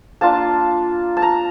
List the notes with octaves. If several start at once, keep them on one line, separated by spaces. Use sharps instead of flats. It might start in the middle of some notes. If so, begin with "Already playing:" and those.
A#3 D4 F4 A5
A5
A#5